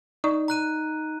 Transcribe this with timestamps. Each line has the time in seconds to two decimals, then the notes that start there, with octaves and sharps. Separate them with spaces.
0.24 D#4 D5 C#6 D#6
0.48 A#5 F#6 D#7